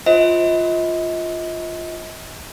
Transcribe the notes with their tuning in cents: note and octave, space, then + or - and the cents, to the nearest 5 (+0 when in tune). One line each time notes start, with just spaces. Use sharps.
F4 +0 C5 +10 D#5 +40